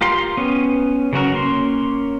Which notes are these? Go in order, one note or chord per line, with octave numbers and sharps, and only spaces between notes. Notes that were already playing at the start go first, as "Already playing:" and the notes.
F4 G4 A#4 F5 C6
B3 C#4
C#3 F#3 F#4 A#4
A#3 C#4 C6